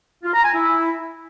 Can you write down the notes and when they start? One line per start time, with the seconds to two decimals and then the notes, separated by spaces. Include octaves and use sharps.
0.23 F4
0.33 A#5
0.43 G#5
0.53 E4